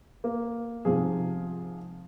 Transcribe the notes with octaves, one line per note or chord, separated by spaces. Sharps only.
A#3
G#2 C3 F3 G#4